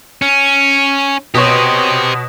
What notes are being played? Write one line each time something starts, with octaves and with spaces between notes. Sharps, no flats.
C#4
B2 G4 C5 C#5